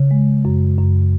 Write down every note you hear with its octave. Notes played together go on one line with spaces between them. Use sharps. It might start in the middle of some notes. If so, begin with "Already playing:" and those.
Already playing: C#3
G#3
F#2
F#2